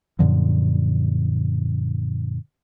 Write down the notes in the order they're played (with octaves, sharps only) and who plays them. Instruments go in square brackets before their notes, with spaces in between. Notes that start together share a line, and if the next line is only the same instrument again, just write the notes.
[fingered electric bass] F#2 A#2 D3 F3